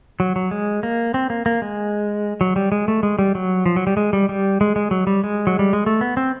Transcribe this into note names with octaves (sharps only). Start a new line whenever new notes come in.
F#3
F#3
G#3
A#3
C4
A#3
A#3
G#3
F#3
G3
G#3
A3
G#3
G3
F#3
F3
F#3
G3
G#3
G3
G3
G#3
G#3
F#3
G3
G#3
F#3
G3
G#3
A3
B3
C4